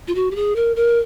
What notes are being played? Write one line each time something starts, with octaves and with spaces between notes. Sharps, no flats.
F4
F#4
G4
G#4
A#4
A#4